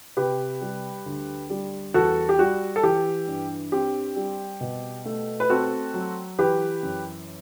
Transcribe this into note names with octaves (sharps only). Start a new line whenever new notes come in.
C3 G4 B4
G3
D2
G3
E2 F#4 A4
G4
G3 F#4
A4
E3 G4
G2
C4 G4
G3
B2
A3
B4
C4 F#4 A4
F#3
E3 G4 B4
F#2